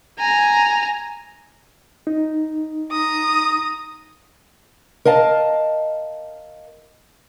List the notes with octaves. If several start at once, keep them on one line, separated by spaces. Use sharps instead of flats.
G#5 A#5
D#4
A#5 D#6
A#4 D#5 F5 A5